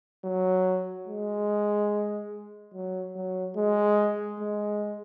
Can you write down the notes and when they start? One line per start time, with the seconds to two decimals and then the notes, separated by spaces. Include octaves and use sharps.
0.24 F#3
1.07 G#3
2.73 F#3
3.16 F#3
3.57 G#3
4.39 G#3